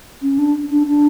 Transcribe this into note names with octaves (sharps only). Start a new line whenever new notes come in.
C#4
D4
D4
D4